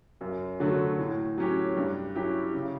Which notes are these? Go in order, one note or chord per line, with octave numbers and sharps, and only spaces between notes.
F#2
D3 F#3 A3
A2
F#3 C#4 G4
G2
F#3 C#4 E4 G4
C#3